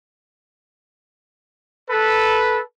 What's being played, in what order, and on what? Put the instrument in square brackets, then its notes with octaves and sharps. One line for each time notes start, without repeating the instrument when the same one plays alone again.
[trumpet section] A4 B4